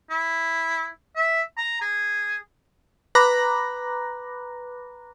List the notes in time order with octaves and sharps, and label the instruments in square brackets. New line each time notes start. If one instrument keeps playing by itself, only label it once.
[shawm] E4
E5
A#5
G#4
[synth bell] B4 A#5 B5 D6 F#6 A#6